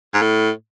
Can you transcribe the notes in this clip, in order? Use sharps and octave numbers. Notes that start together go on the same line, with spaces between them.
G#2
A2